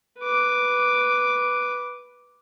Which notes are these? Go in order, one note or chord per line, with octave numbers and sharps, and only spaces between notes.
B4 D6